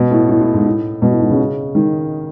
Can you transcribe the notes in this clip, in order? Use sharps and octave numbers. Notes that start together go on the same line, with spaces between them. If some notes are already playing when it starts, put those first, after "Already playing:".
Already playing: B2
A2
A2
A2
G#2
A2
B2
A2
G#2
C#3
D#3